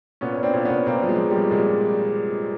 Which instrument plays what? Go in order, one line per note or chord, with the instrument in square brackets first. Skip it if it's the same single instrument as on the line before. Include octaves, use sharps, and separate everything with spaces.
[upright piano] A#2 B3 C#4
A#2
C4 D4
A#2
A#2 B3 C#4
A#2 A#3 C4
F3
G#3
F3
G3
F3
A#2 G#3